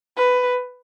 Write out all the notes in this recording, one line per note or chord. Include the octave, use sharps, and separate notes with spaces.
B4